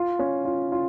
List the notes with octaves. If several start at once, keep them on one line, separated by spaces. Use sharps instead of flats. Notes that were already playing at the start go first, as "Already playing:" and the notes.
Already playing: F4
C#4
F4
F4